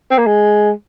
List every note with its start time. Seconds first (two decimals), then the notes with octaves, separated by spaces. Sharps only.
0.11 C4
0.19 A#3
0.26 G#3